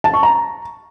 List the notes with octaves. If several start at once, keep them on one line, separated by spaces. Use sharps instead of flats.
A5
C#6
A#5